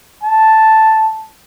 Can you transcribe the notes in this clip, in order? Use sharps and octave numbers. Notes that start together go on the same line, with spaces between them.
A5